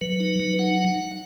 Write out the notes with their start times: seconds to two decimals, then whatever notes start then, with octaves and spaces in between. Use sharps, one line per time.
0.01 F#3 B4
0.20 D#4
0.40 F#3
0.59 D#4 F#5